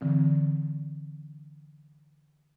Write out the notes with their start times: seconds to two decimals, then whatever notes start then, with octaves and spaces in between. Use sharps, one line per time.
0.01 D3 E3 C4